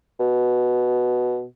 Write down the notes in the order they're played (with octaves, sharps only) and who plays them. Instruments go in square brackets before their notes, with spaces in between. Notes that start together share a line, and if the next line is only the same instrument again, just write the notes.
[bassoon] B2